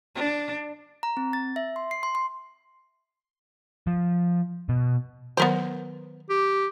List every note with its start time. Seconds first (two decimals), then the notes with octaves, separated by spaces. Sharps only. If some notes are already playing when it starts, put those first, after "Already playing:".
0.15 D4
1.03 A#5
1.17 C4
1.33 A6
1.56 E5
1.76 C6
1.91 C7
2.03 C6
2.15 C6
3.87 F3
4.69 B2
5.37 D#3 F#3 B3 A#4 C5
6.30 G4